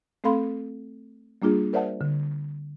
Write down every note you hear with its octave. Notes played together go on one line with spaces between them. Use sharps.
A3 C4 A4 F5 B5 C6
G3 A#3 D4 F4 G#4
A#4 C5 D5 E5 F#5 A5
D3